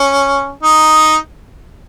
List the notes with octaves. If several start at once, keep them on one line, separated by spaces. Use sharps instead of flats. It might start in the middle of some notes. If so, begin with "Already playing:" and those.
Already playing: C#4
D#4